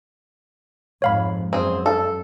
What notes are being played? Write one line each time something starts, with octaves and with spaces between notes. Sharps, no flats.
F2 G#2 C#5 F5 B5
F#2 C4 G#4
A4